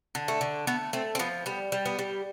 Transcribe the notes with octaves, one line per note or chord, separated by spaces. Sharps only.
D3
A3
D3
A3 B3
A3 C4
C4
F3 B3
G3 B3
G3
B3
G3